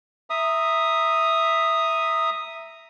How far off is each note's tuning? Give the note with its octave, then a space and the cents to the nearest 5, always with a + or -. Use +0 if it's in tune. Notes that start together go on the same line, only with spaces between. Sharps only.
E5 +0 A#5 +0 D#6 +0